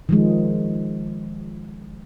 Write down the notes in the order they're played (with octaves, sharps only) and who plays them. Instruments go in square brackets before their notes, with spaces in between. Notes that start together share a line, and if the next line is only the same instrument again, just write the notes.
[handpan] D#3 F3 G#3